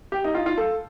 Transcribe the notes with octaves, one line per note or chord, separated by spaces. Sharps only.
G4
D#4
F4
F4
A4